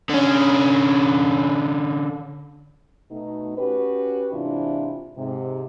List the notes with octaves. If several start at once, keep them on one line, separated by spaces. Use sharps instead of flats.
D3 C#4
B2 A3 D#4
C#4 F#4 G4 B4
G#2 C3 E3 D4 E4 F4
G#2 C3